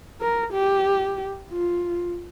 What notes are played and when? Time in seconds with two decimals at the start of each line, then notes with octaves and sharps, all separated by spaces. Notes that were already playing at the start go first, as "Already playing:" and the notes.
0.21 A#4
0.53 G4
1.51 F4